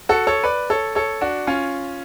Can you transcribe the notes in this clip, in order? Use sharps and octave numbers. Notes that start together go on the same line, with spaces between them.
F#4 A4
A4 C#5
B4 D5
A4 C#5
A4 C#5
D4 F#4
C#4 F4